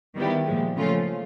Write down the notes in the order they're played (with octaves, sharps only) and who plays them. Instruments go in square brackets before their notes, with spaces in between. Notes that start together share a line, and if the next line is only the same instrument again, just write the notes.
[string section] D#3 G3 B3 E4 G4
A#2 F3 G#3
C#3 F3 A3 C#4 F4